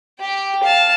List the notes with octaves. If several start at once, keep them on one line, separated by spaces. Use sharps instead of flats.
G4 G5
F5 A5